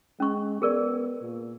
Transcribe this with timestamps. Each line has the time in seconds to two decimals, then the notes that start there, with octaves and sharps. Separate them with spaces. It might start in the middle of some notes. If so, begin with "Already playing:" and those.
0.20 G#3 C#4 C#6
0.62 B3 G#4 A#4 D5
1.22 A#2